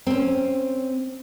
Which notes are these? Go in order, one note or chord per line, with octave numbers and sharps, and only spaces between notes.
C4 C#4